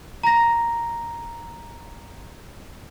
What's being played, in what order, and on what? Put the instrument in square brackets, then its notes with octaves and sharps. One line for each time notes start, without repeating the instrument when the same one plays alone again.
[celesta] A#5 A#6